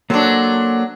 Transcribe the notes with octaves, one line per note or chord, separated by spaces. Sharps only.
F#3 A#3 D4 A4 C5